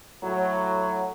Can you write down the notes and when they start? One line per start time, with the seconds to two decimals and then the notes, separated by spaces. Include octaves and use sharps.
0.23 A2 F#3